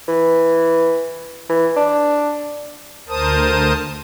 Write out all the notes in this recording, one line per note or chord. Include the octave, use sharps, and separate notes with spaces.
E3
E3
D4
D2 A#4 C5 A5 D#6